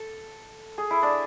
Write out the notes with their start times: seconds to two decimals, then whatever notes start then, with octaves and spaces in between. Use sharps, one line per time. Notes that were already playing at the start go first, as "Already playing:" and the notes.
Already playing: A4
0.78 G#4
0.90 E4
1.03 D4